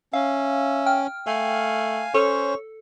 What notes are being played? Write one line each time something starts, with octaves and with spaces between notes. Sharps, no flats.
C#4 E5 F5
G5 F6
A3 F5 G#5
C#4 A4 C5 C#5